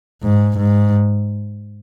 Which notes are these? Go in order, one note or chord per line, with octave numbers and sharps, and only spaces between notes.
G#2
G#2